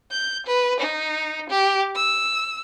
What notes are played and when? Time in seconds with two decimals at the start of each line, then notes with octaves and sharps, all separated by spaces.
0.11 G6
0.46 B4
0.80 D#4
1.49 G4
1.95 E6